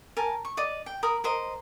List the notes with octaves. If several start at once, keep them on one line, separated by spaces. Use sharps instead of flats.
A#4 G#5 A5
C#6
D5 D#5 D6
G5
A#4 B5 D#6
A#4 C5 D#5